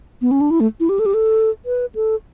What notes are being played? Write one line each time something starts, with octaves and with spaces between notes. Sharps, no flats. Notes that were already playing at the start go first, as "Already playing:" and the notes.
B3
C#4
D4
E4
A3
E4
G4
A4
G4
A4
B4
A4